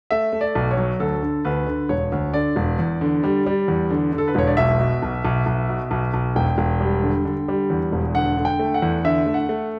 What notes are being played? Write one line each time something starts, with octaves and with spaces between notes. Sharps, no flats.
A3 E5
A3
D5
B1
C#5
F#3
D2 A4
D3
D2 B4
D3
E1 C#5
D2
D3 D5
E1
E2
D3
G3
G3
E2
D3
D3
A4
B4
E1 C#5
D5
B1 E5
B2
B1
B1
B1
B2
B1
B1
E1 G5
E1
G3
D3
D3
G3
E2
E1
D3 F#5
D3
G5
A3
F#5
E2
D3 E5
A3
F#5
A3